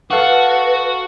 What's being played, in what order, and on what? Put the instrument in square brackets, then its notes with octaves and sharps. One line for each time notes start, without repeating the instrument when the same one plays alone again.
[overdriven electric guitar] F#4 [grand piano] A4 F5 F#5 [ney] B4